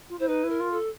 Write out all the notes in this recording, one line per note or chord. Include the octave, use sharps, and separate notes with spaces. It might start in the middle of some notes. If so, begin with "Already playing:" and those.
F4
E4 C5
D#4 B4
E4
A#4
F4
A4